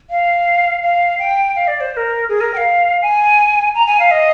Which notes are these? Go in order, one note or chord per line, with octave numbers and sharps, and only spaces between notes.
F5
F5
G5
F5
D5
C5
C5
A#4
G#4
A#4
G5
F5
G#5
A#5
G#5
F5
D#5